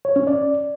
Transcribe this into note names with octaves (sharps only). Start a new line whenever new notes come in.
C#5
C#4
D5